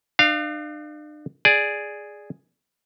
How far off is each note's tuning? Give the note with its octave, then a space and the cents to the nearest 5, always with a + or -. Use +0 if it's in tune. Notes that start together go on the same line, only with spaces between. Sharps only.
D4 +40 F5 -10
G#4 +0 D5 +0